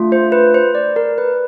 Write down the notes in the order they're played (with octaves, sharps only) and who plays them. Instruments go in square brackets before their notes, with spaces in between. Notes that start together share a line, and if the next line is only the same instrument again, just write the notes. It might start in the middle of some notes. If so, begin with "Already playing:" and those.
Already playing: [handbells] A3 D4 F4
C5
B4
C5
D5
A#4
B4